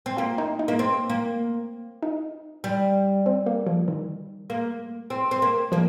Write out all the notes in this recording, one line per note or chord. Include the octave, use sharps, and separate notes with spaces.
C4
A#3 F4
D#4
D#4
A#3
C4
A#3
D#4
G3
C4
A#3
F3
D#3
A#3
C4
C4
A#3
F3 A#3